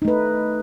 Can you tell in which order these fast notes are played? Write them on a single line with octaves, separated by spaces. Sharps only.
D#4 A3 B4